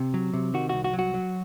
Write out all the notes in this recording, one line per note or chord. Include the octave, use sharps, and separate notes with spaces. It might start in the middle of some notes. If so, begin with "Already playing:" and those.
Already playing: C3
F#3
C3
D#3 F#4
C2 F#4
F#4
F#3
F#4
F#3